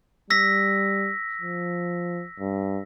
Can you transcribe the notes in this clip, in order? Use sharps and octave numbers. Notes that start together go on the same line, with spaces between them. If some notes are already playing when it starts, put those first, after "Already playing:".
G3 E6 A#6 B6
F3
G2